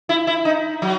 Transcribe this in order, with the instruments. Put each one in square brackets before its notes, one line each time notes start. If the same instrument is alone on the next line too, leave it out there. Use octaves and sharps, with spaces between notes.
[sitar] E4
E4
D#4
F#3